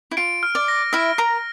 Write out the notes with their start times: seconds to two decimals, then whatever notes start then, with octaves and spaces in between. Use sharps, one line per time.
0.11 E4
0.17 F4 D7
0.43 F6
0.55 D5
0.68 A#6
0.93 E4 E5 F6
1.18 A#4 A#5 D7